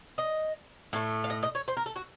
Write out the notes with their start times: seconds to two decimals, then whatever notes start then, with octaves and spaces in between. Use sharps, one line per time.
0.18 D#5
0.93 A2 A3
1.24 F5
1.30 D#5
1.43 D#5
1.55 C#5
1.68 C5
1.77 A#4
1.86 A4
1.96 F#4